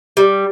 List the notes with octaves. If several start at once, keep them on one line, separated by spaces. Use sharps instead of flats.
G3